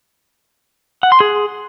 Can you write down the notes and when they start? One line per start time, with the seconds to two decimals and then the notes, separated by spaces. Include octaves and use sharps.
1.03 F#5
1.12 C6
1.20 G#4